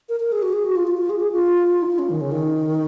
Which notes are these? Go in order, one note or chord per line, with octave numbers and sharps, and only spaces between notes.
A#4
A#4
G#4
F#4
G#4
F#4
F4
F4
F4
G#4
G#4
F4
D#4
F4
C#4
D#3
C#3
D#3